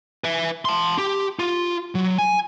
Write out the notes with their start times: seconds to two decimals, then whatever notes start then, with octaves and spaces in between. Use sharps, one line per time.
0.24 B4 E5
0.65 A5 C6
0.98 G4
1.39 F4
1.95 F#3
2.18 G#5